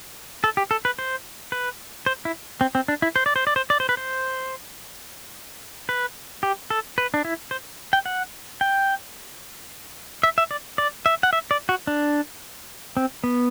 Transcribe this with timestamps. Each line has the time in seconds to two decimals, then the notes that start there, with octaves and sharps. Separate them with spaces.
0.44 A4
0.57 G4
0.71 A4
0.85 B4
0.99 C5
1.52 B4
2.06 C5
2.25 E4
2.61 C4
2.75 C4
2.88 D4
3.02 E4
3.16 C5
3.26 D5
3.36 C5
3.47 D5
3.56 C5
3.70 D5
3.80 C5
3.89 B4
3.97 C5
5.89 B4
6.43 G4
6.70 A4
6.98 B4
7.14 D4
7.25 E4
7.51 C5
7.93 G5
8.06 F#5
8.61 G5
10.23 E5
10.38 E5
10.51 D5
10.78 D5
11.06 E5
11.23 F#5
11.33 E5
11.51 D5
11.69 F#4
11.87 D4
12.97 C4
13.24 B3